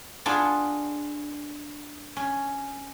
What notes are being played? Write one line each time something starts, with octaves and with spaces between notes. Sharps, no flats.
B3 D4 F4 G#4
C#4